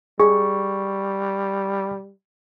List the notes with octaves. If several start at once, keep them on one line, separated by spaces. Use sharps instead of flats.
G3 G#4 C#6